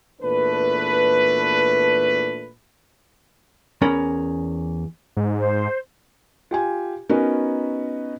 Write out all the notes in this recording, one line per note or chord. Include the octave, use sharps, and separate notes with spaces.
E2 A#2 A3 D4 B4
E2 C#4 A#4 B5
G#2
C5
F4 G4 G#5
B3 C#4 D#4 F#4 A#4 B4